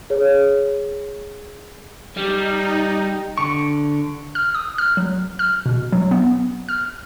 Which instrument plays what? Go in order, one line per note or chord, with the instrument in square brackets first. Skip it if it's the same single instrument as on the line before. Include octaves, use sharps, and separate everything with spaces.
[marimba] G#4 C#5
[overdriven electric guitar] G3 [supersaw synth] D#4
[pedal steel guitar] D3 C#6
[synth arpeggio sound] F6
D#6
F6
F#3
F6
B2
F#3
B3
F6